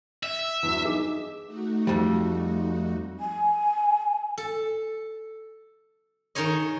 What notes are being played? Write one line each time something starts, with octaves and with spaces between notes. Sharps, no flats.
E5
E2 G2 F#3
D#4 G#4 D6
A3 D#4 F#4
F2 G3
G#5
A4
D#3 D#4 G#4 C#5 D#5